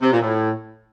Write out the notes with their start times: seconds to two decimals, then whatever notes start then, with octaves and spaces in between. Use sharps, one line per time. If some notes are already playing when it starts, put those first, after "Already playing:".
0.01 C3
0.12 A#2
0.22 A2